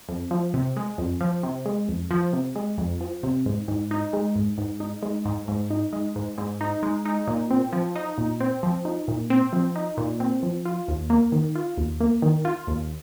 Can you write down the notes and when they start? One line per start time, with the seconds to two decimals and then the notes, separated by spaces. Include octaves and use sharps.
0.09 F2
0.31 F3
0.54 C3
0.76 G#3
0.98 F2
1.21 F3
1.43 C3
1.66 G#3
1.88 F2
2.11 F3
2.33 C3
2.55 G#3
2.78 F2
3.01 F3
3.23 C3
3.46 G#2
3.68 G#2
3.91 D#4
4.13 G#3
4.36 G#2
4.58 G#2
4.80 D#4
5.03 G#3
5.25 G#2
5.48 G#2
5.71 D#4
5.93 G#3
6.16 G#2
6.38 G#2
6.61 D#4
6.83 G#3
7.05 D#4
7.27 A#2
7.51 C4
7.73 F3
7.96 D#4
8.18 A#2
8.40 C4
8.63 F3
8.85 D#4
9.08 A#2
9.30 C4
9.53 F3
9.76 D#4
9.97 A#2
10.20 C4
10.43 F3
10.65 F4
10.88 D#2
11.10 A#3
11.32 D#3
11.55 F4
11.77 D#2
12.00 A#3
12.22 D#3
12.45 F4
12.67 D#2